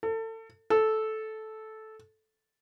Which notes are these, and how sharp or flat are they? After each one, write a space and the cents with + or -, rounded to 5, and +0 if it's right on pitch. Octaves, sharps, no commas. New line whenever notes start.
A4 +30
A4 -10